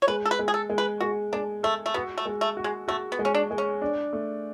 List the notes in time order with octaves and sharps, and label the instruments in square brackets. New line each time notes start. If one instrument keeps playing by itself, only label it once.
[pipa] C#5
[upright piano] G#3 [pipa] B4
[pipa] A4
B4
[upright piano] G#3
[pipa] G#4
A4
[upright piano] G#3
[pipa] B4
[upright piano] G#3 [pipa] F#4
[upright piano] G#3 [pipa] D4
[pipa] A3 [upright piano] A4
[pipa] A3
[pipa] B3 [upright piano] F#4
[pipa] A3
[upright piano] G#3
[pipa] A3
[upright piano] F#4
[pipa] G#3
[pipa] A3 [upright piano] F#4
[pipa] B3
[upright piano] G#3
[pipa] C#4
D4
[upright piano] G#3
[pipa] C#4
[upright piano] D4
A3